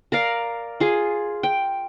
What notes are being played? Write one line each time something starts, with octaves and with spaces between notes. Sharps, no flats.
A#4 D5 F5
F4 G#4
G5